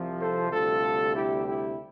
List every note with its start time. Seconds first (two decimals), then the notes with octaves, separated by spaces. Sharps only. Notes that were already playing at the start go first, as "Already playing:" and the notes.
Already playing: C2 C3 F3
0.20 A4 C5
0.52 D2 C3 G3 F4 A4
1.15 E4 G4
1.46 E4 G4